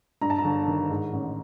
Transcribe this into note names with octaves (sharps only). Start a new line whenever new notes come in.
G2 A#5
A5
A#5
G1
D#3
G#2
A1